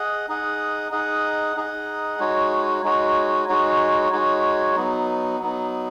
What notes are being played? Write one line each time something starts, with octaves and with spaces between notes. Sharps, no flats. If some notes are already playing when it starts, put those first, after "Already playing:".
Already playing: G#4 D#5 F#5
D#4 G#4 D#5 F#5
D#4 G#4 D#5 F#5
D#4 G#4 D#5 F#5
G#3 D#4 F#4 C#5
G#3 D#4 F#4 C#5
G#3 D#4 F#4 C#5
G#3 D#4 F#4 C#5
F#3 B3 D#4
F#3 B3 D#4